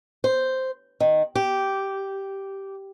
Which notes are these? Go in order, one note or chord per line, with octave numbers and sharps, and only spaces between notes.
C5
D#3
G4